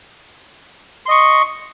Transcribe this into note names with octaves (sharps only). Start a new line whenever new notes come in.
D#5 C6 C#6